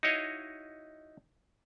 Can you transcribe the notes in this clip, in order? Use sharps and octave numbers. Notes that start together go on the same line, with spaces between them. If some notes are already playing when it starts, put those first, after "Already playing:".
D#4 E4 F#4 C#5 D#5 F5